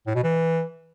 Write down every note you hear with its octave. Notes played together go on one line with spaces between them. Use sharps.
A2
B2
E3